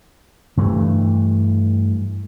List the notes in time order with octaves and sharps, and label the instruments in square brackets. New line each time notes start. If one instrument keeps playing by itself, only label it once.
[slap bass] G2 E3 A3